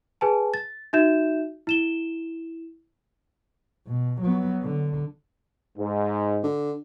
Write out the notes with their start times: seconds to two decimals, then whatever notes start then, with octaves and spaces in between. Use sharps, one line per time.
0.21 G#4 B4 G#5 A5
0.54 A6
0.93 D#4 F#4 E5 G6 E7
1.67 E4 E7 G7
3.88 B2
4.22 F#3 B3
4.63 D3
5.77 G#2
6.43 D3